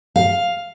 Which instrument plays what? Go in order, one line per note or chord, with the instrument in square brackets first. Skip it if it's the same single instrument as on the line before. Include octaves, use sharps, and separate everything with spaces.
[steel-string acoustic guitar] F5